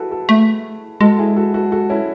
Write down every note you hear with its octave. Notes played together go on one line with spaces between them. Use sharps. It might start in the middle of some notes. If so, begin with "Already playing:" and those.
Already playing: E4 F#4 G#4 A4 B4
F#4 A4
A3
G#3 F#4 A4
E4 G#4
F#4 A4
F#4 A4
F#4 A4
C#4 E4